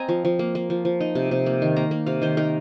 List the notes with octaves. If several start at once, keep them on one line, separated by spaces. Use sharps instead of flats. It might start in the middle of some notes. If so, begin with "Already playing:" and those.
Already playing: C4 D#5 G#5 A#5
F3
F3
A#3
A#3
F3
F3
D#4
C3
C3
A#3
D#3
A#3 A#5
A#3
C3 F5
D#3 C5
D#4 A#4